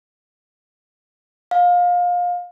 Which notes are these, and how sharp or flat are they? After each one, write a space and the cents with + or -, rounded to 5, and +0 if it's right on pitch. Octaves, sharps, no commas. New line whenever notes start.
F5 +25